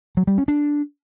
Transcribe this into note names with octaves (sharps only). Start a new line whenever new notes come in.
F#3
G3
C#4
D4